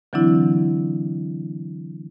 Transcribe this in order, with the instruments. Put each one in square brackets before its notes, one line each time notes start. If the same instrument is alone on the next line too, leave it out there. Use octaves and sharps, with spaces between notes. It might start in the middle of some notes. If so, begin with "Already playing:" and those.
[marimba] D3 E3 F#3 C4 D4 E4